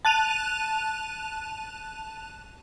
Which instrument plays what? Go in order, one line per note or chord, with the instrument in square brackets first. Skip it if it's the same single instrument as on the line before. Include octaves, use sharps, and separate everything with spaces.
[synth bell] A5 F#6 D#7 F7